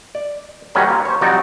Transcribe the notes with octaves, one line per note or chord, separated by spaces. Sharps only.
D5
B1 D#3 F#3 G3 C#4
A#3 F4
C5 C#5
C2 F3 F#3 D#4 F#4 D5